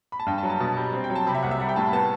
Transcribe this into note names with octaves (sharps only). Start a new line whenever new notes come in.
B5
A5
G2 G5
A5
F#3
A5
B2 A5
G3
C4
G5
F#3
A5
C3 B5
E5
C2 F#5
E5
G3 F#5
G5
A2 A5
B5
B3 A5